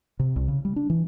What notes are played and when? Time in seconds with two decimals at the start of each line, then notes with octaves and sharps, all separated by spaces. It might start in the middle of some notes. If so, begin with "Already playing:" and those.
0.20 C3
0.36 C2
0.48 C#3
0.65 G3
0.76 D4
0.90 E3